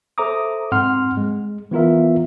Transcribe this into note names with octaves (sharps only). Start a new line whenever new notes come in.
A4 C5 E5 A#5 D6 D#6
G#2 C4 F#5 C6 F6
G#3
E3 B3 F4 A#4 E5